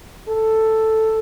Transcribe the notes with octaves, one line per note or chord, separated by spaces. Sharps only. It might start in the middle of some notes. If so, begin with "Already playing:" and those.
A4